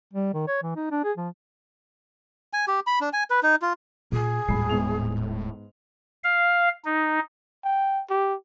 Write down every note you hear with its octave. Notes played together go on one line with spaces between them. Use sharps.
G3
D#3
C#5
E3
D#4
D4
G#4
F3
G#5
G4
B5
D4
G#5
B4
D#4
F4
A#2 G#4
D#1 A2 G#3 B5 C7
G#2 B3 F7
F5
D#4
G5
G4